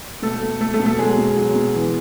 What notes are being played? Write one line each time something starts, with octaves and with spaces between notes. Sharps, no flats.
B2 A3 A4
A3
A3 A4
A3 A4
B2
A3 A4
F#3 G#3 G#4
B2
F#3
B2
E3